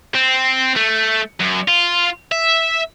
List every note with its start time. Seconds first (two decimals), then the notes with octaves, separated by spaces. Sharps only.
0.15 C4
0.76 A3
1.40 F#2
1.68 F4
2.32 E5